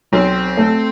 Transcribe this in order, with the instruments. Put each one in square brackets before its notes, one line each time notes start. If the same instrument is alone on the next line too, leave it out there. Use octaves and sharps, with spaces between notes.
[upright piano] B1 [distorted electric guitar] C4
[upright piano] A3